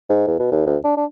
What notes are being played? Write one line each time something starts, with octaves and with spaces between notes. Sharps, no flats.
G#2
E2
B2
D#2
D2
D4
D4